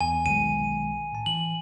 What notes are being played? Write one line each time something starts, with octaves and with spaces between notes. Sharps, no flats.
E2 G#5
B1 D#3 G#3 D#7
A2 A5
E3 F#7